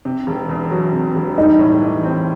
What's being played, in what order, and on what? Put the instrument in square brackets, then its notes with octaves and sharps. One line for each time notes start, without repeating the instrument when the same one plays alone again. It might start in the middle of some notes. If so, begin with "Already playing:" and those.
[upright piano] C3
E1
E2
F#3
C3
E1
[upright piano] G3 [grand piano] D#4
[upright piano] A2
E3
C4